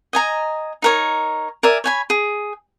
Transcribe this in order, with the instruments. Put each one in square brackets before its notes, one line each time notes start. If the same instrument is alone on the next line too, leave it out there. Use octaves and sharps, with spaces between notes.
[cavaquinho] D#5 G#5 A#5
D#4 A#4 C#5
A#4 D5 E5 G#5
C#5 G#5 B5
G#4